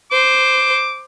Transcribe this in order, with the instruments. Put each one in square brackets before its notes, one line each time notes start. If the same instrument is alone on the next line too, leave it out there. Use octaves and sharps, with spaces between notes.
[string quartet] C5 [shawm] D6